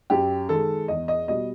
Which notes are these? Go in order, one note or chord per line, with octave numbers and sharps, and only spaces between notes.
F#2 G4
D#3 G#3 A4
E2 D#5
D#5
B2 G3 D#5